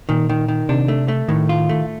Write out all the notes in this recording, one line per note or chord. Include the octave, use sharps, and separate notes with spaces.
A#2 D#3
D#3
D#3
C3 D4
A3
A3
A2 D#3
F4
A3